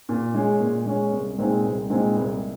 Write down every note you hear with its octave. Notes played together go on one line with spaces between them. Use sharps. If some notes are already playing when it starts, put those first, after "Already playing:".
A#2
G#3 C#4
A#2
G#3 C#4
C2
A#2 G#3 C4 D#4
C2
A#2 G#3 C4 D#4
C2